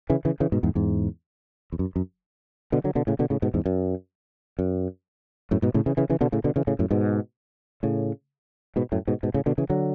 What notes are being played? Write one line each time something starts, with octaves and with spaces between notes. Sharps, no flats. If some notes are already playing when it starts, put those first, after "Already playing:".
C#3 E3
C#3 E3
C#3 E3
G#2 B2
E2 G#2
E2 G#2
E2
F#2
F#2
B2 D3
D3 F#3
B2 D3
A2 C#3
B2 D3
A2 C#3
G#2 B2
E2 G#2
F#2
F#2
F#2 A2
G#2 B2
A2 C#3
C#3 E3
C#3 E3
C#3 E3
B2 D3
A2 C#3
B2 D3
C#3 E3
A2 C#3
F#2 A2
G#2 B2
A2 C#3
G#2 B2
F#2 A2
G#2 B2
G#2 B2
A2 C#3
B2 D3
C#3 E3
D3 F#3